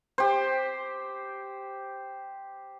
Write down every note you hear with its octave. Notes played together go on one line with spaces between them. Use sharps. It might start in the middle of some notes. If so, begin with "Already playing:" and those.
G4 C5